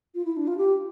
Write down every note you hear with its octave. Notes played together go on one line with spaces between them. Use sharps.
F4
E4
D4
F4
G4